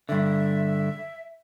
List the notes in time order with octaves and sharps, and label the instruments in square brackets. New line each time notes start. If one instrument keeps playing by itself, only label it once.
[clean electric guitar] G2 D3 [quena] E5